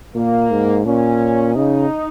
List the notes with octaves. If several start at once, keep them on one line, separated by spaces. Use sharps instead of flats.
A#2 A#3
G#2
A#2 C#4
C#3 D#4